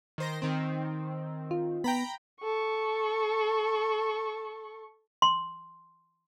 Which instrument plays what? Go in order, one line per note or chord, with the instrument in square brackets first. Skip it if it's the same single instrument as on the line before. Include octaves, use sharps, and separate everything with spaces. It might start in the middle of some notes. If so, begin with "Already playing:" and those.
[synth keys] D#3 C5 A#6
D#3 C4
[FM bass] F4
[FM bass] B3 [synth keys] G5 A#5 B5
[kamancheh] A4 C#6
[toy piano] C6